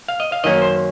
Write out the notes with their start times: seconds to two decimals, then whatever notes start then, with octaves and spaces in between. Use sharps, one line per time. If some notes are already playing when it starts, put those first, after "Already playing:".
0.08 F5
0.20 D#5
0.32 F5
0.44 F#2 D#3 F#3 A#3 C#4 D#5
0.62 C5